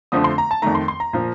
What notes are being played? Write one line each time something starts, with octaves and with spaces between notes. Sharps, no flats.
F2 D3 F3 A3 D#6
C6
A#5
A5
F2 D#3 A3 A#5
C6
C6
A#5
A#2 F3